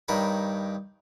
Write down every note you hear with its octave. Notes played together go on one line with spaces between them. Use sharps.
G2 D#3 A#4 C#5 B5